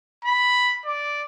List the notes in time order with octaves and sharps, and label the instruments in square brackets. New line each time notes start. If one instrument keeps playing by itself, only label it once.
[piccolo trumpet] B5
D5